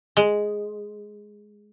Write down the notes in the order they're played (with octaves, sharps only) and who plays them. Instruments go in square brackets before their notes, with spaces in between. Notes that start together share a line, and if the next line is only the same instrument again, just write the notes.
[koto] G#3